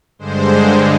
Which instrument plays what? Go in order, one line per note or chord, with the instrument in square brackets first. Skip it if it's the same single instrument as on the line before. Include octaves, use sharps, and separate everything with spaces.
[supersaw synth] G2 D3 G#3 C5